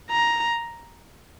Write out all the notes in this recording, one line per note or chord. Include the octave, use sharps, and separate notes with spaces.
A#5